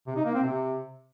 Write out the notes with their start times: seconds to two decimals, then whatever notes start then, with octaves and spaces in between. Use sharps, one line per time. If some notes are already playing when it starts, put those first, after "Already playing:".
0.07 C3
0.16 D#4
0.25 A#3
0.34 C4
0.44 C3